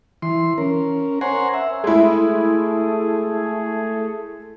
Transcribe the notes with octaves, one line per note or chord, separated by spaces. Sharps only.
E3 C6
C#4 A#4
C5 C#5 F#5 G#5 A#5 C6
E5
G#3 A3 E4 G#4